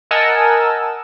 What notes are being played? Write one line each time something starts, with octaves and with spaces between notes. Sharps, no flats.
A#4 D#5 F#5 G#5 A5 E6